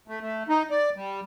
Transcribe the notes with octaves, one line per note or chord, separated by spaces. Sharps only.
A3
A3
D#4
D5
G3